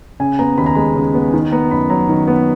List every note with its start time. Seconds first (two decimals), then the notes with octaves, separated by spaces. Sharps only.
0.20 C#3 G#5
0.39 B3 A#5
0.58 D#2 B5
0.66 A#5
0.75 G#3 B5
0.95 C#3
1.15 B3
1.34 D#3
1.52 B3 A#5
1.71 F#2 B5
1.90 F#3 A#5
2.09 D#3
2.28 B3